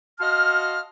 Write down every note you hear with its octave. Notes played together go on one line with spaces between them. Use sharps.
F#4 D#5 F5 A5 C6 F6